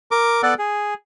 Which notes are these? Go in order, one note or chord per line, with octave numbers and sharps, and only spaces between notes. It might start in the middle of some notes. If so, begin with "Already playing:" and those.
A#4 D6
B3 A4 D5 F#5
G#4